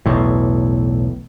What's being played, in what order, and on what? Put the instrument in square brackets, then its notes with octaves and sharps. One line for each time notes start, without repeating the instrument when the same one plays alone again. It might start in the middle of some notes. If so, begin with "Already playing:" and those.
[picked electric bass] B1 E2 A2